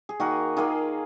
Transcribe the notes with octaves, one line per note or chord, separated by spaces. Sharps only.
G#4
D#3 A#3 F#4 A#4
D#3 A#3 F4 G#4